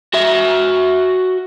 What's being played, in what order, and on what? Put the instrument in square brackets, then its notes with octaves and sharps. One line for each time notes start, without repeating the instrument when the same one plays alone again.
[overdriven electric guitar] F#4 E5